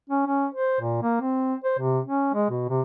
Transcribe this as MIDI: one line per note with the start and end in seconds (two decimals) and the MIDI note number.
0.10 0.23 61
0.27 0.47 61
0.54 0.80 72
0.81 1.01 46
1.02 1.17 58
1.21 1.55 60
1.64 1.74 72
1.79 2.00 48
2.05 2.31 61
2.34 2.47 56
2.50 2.64 47
2.69 2.82 48